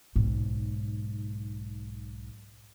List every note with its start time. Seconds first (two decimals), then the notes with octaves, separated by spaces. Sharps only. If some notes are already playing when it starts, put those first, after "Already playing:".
0.16 B1 G#2